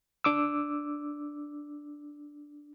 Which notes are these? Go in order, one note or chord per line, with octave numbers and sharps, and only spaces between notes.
D4 D6 E6